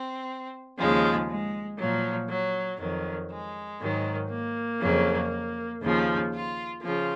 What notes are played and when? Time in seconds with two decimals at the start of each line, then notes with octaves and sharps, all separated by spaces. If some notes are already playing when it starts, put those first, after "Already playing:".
Already playing: C4
0.78 D#2 C#3 F3 G#3
1.29 G#3
1.78 A#2 F3 F#3
2.29 F#3
2.80 F2 D#3 F#3
3.31 G#3
3.80 G#2 D#3 F#3
4.31 A#3
4.81 F2 C#3 F#3
5.81 D#2 C#3 F3
6.32 F4
6.82 C#3 F3 F4